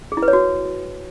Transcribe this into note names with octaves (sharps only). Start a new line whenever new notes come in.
G#4
E4
B4
C#5
F#4